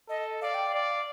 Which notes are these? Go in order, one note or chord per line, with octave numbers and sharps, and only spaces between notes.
A4 D#5
D5 F5
G5
F5
D5